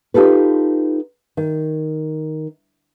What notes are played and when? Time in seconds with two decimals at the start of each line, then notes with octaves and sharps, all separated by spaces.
0.14 D#4 F4 G4 A4 B4
1.37 D#3